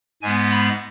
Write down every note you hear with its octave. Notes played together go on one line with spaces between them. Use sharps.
G#2 G#3 B3 G#5
B5